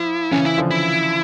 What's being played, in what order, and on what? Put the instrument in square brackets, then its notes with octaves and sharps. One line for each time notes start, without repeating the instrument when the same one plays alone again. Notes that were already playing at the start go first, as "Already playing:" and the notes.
Already playing: [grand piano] F3 [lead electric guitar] E4
[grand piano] C#3 E3 [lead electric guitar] C#4
[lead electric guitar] E4
[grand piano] D3 F3
[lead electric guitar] E4